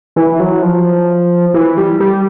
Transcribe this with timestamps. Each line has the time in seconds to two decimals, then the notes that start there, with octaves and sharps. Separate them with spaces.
0.16 E3
0.40 F#3
0.62 F3
1.54 E3
1.77 G3
2.00 G3